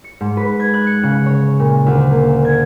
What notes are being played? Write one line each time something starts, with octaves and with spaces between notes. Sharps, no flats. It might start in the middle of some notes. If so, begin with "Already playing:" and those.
C#7
G#2
B4
G#6
F#6
C#7
C#3
C#5
A#2
D2
A#3
G#6